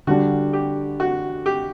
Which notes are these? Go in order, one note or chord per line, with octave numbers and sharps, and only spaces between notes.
D3 G3 D4 F#4
G4
F#4
G4